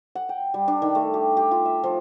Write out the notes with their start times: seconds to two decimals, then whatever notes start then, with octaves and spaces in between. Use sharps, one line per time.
0.15 F#5
0.29 G5
0.54 G3
0.68 D4
0.82 D#3
0.95 A3
1.14 G4
1.37 G4
1.51 F4
1.65 E5
1.84 F3